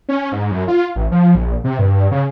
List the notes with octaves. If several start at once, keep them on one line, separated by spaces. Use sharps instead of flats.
C#4
G#2
F#2
F4
A1
F3
A#1
C3
G2
C#3